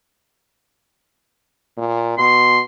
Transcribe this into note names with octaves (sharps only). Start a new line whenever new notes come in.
A#2
B2 C6